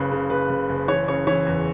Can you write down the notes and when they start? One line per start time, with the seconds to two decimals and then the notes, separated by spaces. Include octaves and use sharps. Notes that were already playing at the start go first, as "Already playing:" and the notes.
Already playing: F#1 C#3 B4
0.12 C#3
0.30 F#1 B4
0.49 F#1
0.69 F#1
0.88 E3 C#5
1.08 C#3 C#5
1.27 E3 C#5
1.46 E2